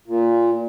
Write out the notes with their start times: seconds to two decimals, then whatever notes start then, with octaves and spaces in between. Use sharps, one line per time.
0.08 A#2